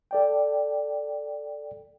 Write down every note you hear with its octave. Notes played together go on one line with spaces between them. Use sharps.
A4 D5 G5